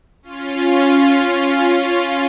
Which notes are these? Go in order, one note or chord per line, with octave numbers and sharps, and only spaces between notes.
C#4 F4